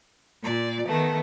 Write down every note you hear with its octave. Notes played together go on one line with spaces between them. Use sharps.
A#2 D5
D#3 A3 B3